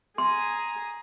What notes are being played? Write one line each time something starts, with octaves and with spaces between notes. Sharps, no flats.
G#4 A#5 C6 D#6